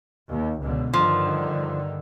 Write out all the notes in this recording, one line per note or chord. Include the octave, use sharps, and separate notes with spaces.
D#2
C#2 B2 D3
G2 D3 D#3 F3